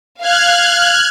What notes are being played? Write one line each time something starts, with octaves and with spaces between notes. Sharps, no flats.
F5 F6 F#6 G#6